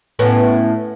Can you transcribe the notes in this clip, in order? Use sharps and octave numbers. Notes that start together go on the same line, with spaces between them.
A2 B3 C#4